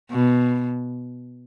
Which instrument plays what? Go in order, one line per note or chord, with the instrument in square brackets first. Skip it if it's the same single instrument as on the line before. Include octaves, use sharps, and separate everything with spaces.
[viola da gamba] B2